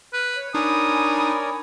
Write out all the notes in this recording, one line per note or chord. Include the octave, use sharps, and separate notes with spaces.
B4 F6 F#6
C#5
D4 D#4 A#4 C#5 D5 G#5 B5 D#6